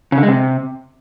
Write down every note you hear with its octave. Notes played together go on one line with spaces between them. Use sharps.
C#3
D3
G#3
C3